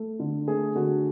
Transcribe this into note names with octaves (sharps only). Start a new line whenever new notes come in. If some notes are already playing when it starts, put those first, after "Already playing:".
Already playing: A3 A4
D3
A3 G#4
D3 F#4